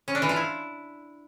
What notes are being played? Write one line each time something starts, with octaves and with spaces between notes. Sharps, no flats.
C#4
D4
E3
F4
E4